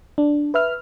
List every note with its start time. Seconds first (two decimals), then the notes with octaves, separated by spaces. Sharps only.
0.18 D4
0.54 B4 E5 F6